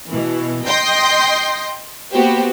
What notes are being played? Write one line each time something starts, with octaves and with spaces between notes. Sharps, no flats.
B2 E3
D#5 G5 C6 G6 A#6 C7
A#3 B3 F#4 G4 C5